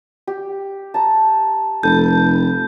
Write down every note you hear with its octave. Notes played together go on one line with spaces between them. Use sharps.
G4
A5 A#5
F1 A4 B4 G6